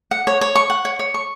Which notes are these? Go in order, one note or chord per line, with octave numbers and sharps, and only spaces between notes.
F#5
C#5
C#5
C#6
F#5
C#5
C#5
C#6